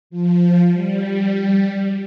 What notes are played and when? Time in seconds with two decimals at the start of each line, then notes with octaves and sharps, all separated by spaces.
0.10 F3
0.71 G3